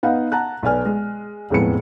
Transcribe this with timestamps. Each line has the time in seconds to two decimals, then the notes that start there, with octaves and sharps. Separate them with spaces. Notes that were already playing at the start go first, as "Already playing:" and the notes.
0.03 B3 D#4 F5 F#5
0.32 F#5 A5 A#5 F#6
0.63 B1 B4 D5 G#5 F6
0.85 G#3
1.50 E1 F2 A2 G#3 B3 C#7